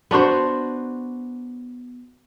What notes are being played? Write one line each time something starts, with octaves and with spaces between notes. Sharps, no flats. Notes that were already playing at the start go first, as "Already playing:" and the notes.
B3 D4 F#4 C5